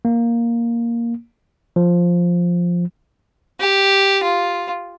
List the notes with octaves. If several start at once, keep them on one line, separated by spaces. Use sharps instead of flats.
A#3
F3
G4
F4